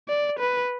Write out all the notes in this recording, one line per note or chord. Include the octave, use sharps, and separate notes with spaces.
D5
B4